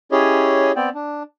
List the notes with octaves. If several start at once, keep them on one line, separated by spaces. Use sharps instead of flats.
C#4 E4 G4 G#4 C#5 D#5
B3 C4 D5 G5
D4